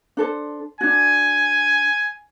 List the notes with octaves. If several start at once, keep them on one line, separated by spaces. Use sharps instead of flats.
D4 A4 C5
D4 F#4 G#5